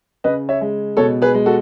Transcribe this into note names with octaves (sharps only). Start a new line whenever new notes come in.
C#3 B4 D#5
C#5 E5
G#3
B2 A4 C#5
G#4 B4
G#3
F#4 A4